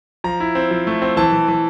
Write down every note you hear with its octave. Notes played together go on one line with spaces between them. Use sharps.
F3 A#5
E4
C4
F3
A3
C4
E3 A5
E3
E3